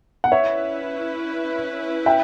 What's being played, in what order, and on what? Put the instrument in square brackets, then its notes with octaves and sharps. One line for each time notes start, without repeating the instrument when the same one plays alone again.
[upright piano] F#5
[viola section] C#4 E4 B4 [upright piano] C#5 E5
[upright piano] E5 G5